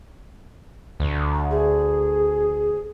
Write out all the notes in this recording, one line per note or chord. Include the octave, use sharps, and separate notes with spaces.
D2
G#4